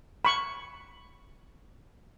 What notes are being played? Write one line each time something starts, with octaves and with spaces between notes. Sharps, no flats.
B5 C#6